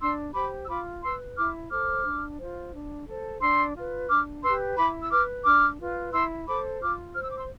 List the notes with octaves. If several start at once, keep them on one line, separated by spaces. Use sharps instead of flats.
D4 C6 E6
G4 C5 B5 D6
E6
F4 B5 D6
B4 C6 E6
E4 D6 F6
A4 C5 D6 F6
D4
F4 C5
D4
A4 C5
D4 C6 E6
F4 B4
D4 D6 F6
G4 B4 C6 E6
E4 B5 D6
E6
B4 D6 F6
D4 D6 F6
F4 B4
E4 C6 E6
A4 C5 B5 D6
F4 D6 F6
C5 F6
E6
D6
C6 E6